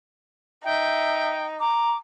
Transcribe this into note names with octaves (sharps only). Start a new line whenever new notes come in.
D#4 E5 G5
A#5 D6